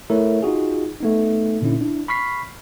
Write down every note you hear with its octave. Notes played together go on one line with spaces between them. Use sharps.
A3 E4 A#4 C#5 E5
D#4 F4 F#4 G#4
A3 B3 D#4
A#2 D3 C#4 D#4 E4
D4 E4
B5 C#6 F6 B6 C7